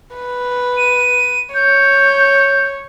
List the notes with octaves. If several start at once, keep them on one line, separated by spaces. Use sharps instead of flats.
B4
D#7
C#5 G6